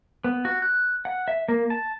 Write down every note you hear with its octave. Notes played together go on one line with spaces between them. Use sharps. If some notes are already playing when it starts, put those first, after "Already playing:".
B3
F#4
F#6
F#5
E5
A#3
A5